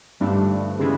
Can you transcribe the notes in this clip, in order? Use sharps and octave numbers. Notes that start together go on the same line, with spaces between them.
G2 D3 F3 A3 D4
C#3 E3 G#3 B3 E4